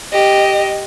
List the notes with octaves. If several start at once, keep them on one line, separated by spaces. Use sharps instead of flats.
G4 D#5